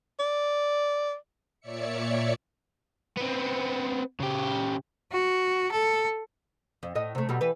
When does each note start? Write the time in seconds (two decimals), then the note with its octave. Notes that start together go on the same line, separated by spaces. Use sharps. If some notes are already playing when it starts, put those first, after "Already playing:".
0.20 D5
1.60 A#2 C#5 D5 E5 C#7
3.17 B3 C4
4.20 C#3 G4
5.12 F#4
5.72 A4
6.83 F2
6.95 A2 D#5
7.15 C3 A3
7.29 B2 F#3 G3
7.41 E3 B4